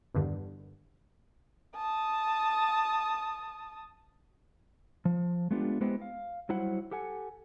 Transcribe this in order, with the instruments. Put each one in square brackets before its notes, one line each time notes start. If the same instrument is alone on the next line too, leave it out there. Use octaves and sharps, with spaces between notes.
[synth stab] E2 G2 D3 D#3
[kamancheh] A5 D#6
[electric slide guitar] F3
G#3 A3 B3 D4 F4 G4
G#3 B3 E4 G4 C5 D#5
F5
F#3 G3 E4 C5 F#5
G4 A4 F#5 G#5